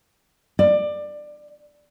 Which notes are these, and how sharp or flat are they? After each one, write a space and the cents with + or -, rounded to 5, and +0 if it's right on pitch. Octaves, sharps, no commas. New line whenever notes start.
D5 +20